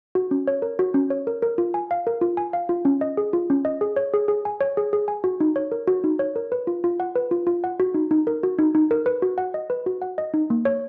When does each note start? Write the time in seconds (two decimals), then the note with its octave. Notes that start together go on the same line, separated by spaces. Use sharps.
0.15 F#4
0.31 C#4
0.48 C#5
0.62 A#4
0.79 F#4
0.94 C#4
1.10 C#5
1.27 A#4
1.42 A#4
1.58 F4
1.74 G#5
1.91 F5
2.07 A#4
2.21 F4
2.37 G#5
2.53 F5
2.69 F4
2.85 C#4
3.01 D#5
3.17 G#4
3.33 F4
3.50 C#4
3.65 D#5
3.81 G#4
3.96 C#5
4.14 G#4
4.28 G#4
4.45 G#5
4.61 C#5
4.77 G#4
4.93 G#4
5.08 G#5
5.24 F#4
5.40 D#4
5.56 C#5
5.72 A#4
5.87 F#4
6.04 D#4
6.19 C#5
6.36 A#4
6.52 B4
6.67 F4
6.84 F4
7.00 F#5
7.16 B4
7.31 F4
7.47 F4
7.64 F#5
7.80 F#4
7.94 D#4
8.11 D#4
8.27 A#4
8.43 F#4
8.59 D#4
8.75 D#4
8.91 A#4
9.06 B4
9.22 F#4
9.38 F#5
9.54 D#5
9.70 B4
9.86 F#4
10.02 F#5
10.18 D#5
10.34 D#4
10.50 A#3
10.65 C#5